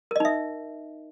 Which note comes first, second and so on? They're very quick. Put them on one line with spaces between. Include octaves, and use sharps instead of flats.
A#4 D#5 D#4 E5